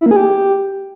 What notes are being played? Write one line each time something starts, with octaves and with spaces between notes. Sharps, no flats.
E4
A#3
G#4
G4